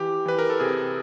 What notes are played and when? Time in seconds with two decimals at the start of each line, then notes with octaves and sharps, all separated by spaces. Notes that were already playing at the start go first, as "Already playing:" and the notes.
Already playing: E3 G4
0.26 E3 B4
0.39 A#4
0.50 A4
0.60 C3 G#4